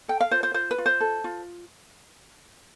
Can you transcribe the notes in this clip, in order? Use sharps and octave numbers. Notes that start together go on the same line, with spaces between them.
A4 G5
F5
F4 C5
C5
F4 C5
B4
F4
C5
A4
F4